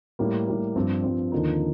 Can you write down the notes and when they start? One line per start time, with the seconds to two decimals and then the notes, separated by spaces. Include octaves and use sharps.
0.19 A2 G3 A#3
0.48 A2 G3 A#3
0.75 G2 F3 C4
1.04 G2 F3 C4
1.32 D#2 D3 F3 A#3 D#4